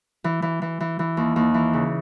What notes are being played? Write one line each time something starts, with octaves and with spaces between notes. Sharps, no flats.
E3
E3
E3
E3
E3
D#2
D#2
E3
C#3